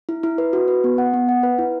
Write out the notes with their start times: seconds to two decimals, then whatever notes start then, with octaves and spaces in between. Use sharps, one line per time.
0.09 E4
0.23 E4
0.38 B4
0.53 F#4
0.68 B4
0.84 B3
0.98 F#5
1.14 B3
1.29 F#5
1.43 B4
1.59 E4